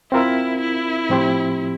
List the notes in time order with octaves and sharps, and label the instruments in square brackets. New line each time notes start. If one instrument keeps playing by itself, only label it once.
[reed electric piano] C4 F4 A#4 E5 [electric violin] E4
[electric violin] E4
[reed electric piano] A2 F3 C4 G4 C5